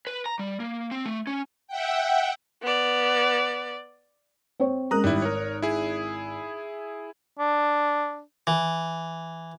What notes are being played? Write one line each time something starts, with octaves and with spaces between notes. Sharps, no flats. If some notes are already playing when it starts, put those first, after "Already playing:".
B4
A#5
G3
A#3
C4
A3
C#4
E5 F#5 G5
B3 D5
C4 C#5
G#3 C#4 A#4 A#5 D#6 F#6
G#1 G3 E4
A#4 C#5
E4 G#4
D4
E3